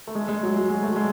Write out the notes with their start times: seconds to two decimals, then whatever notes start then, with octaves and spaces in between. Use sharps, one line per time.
0.07 A3
0.15 G#3
0.28 G#3
0.43 F#3
0.56 F#3
0.70 G#3
0.83 A3
0.96 G#3